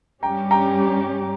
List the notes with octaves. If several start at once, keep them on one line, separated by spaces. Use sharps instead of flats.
G2 G3 C#4 G4 G5 A#5
G5 A#5